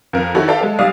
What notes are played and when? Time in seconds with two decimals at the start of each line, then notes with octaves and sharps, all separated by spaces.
0.13 F2 A#4
0.35 D#3 E4 F#4 A4 C#5
0.48 A4 D5 E5 F5 G5 A5
0.61 G#3 A4
0.78 B1 G3 D5 F5 D#6